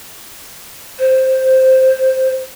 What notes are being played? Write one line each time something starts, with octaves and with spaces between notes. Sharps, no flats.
C5